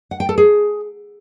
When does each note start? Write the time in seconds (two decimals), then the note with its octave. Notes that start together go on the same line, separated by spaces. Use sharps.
0.11 F#5
0.20 G5
0.29 A4
0.38 G#4